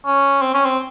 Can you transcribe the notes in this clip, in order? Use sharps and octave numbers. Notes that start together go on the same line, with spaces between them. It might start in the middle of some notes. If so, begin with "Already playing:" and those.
C#4
C4
C#4
C4